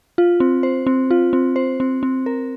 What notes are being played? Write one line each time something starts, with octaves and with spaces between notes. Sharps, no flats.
F4
C4
C5
C4
F4
C4
C5
C4
C4
A#4